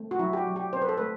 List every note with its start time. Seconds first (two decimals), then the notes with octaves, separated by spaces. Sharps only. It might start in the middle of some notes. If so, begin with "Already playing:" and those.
Already playing: A3 C4
0.11 F#4
0.19 F#3 E4
0.33 G4
0.37 F#4
0.47 F#3
0.56 G4
0.73 C4 C5
0.82 B4
0.89 A4
0.97 A3 B4